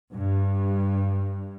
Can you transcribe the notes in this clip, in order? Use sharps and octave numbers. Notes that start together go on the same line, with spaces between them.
G2